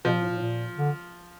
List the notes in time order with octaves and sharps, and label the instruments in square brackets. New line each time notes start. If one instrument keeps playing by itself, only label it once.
[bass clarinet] B2 [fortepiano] F3
[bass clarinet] A#2
A2
A#2
A2
A#2
D3